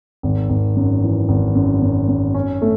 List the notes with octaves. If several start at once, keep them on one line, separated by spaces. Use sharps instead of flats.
G#1
G#1
F#2
E3
G#1
F#2
F#2
F#2
C#4
A3